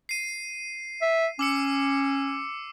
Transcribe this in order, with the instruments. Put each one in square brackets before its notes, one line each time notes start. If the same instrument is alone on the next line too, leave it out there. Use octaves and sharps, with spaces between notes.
[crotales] C7 D#7
[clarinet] E5
[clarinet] C#4 [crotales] D6 E6 C#7